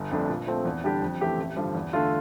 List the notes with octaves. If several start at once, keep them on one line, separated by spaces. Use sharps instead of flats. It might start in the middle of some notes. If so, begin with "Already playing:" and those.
Already playing: G1
F2 D3 A3 D4
A#2
F3 A3 C4
E2
D3 G3 D4 G4
F2
E3 A3 C4 G4
A1
G2 D3 F3
E2
D3 A3 D4 F4